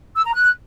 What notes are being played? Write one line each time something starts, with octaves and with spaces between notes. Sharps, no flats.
E6
A#5
F#6